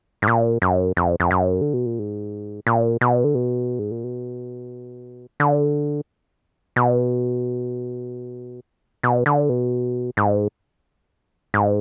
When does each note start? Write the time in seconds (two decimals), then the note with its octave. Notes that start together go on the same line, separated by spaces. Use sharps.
0.22 G#2
0.28 A#2
0.62 F#2
0.97 F2
1.20 F2
1.31 F#2
1.61 D3
1.74 B2
1.86 A#2
1.99 G#2
2.67 A#2
3.01 B2
3.24 D3
3.35 B2
3.79 G#2
3.91 A#2
4.04 B2
5.40 D3
6.76 B2
9.03 B2
9.26 D3
9.49 B2
10.17 G#2
11.54 G#2